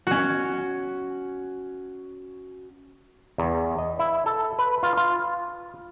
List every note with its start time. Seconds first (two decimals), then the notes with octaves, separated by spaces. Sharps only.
0.07 C#4 F#4
3.38 E2
3.78 D#5
3.99 E4
4.26 A4
4.59 B4
4.83 F4
4.97 F4